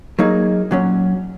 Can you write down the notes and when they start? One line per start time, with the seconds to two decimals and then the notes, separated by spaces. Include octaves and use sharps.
0.19 F#3 A#3 D#4 G#4
0.71 A#2 F#3 C#4